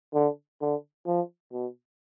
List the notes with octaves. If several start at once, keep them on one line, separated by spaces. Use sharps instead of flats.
D3
D3
F3
B2